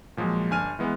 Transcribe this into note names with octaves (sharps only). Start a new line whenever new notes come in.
A#2 F3 F#3 G#3
G1 D4 G#5 F6 D#7
E3 G#3 B3